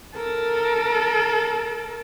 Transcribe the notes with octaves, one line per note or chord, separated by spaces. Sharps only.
A4 A#4